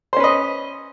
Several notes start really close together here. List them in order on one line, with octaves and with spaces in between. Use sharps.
C5 C#4 B4 D#5